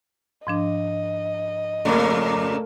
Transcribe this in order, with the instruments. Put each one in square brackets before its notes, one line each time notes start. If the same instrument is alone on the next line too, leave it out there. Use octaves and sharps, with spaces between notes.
[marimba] G#2 F3 D4 [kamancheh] D#5
[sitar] F2 A#2 C#3 [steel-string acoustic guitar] A3 A#3